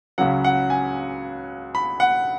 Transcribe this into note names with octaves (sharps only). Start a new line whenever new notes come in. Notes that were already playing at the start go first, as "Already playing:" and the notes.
C#2 C#3 F#3 F#5
F#5
G#5
B5
F#5